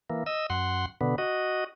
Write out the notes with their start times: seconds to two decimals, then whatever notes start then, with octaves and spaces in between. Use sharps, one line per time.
0.10 E3 A#3
0.26 D#5 E6
0.50 F#2 F#5 C6
1.01 B2 D3 B3
1.18 F#4 D#5